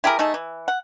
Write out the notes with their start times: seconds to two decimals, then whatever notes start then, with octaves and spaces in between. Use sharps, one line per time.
0.04 E4 G4 G#4 A#4
0.19 A3 D#4 G#4 A4
0.34 E3
0.68 F#5